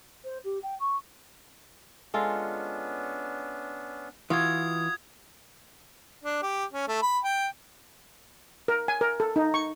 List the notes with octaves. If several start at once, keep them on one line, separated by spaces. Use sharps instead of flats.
C5
G4
G5
C#6
G#3 B3 C#4 D4 F4 A4
E3 F4 F#4 D#6 G#6
D4
G4
C#4
A3
B5
G5
A#4
G#5
A#4
A4
D#4
C#6